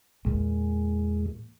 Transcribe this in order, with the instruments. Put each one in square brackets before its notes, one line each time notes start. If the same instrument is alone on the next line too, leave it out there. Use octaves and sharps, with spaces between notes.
[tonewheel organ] E2 G#3 [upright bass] A#2 E3